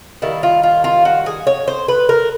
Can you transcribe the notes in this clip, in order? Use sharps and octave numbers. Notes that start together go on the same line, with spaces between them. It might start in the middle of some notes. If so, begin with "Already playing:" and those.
D#3 G3 A#3 E4
F4
F4
F4
F#4
G#4
C#5
C5
B4
A#4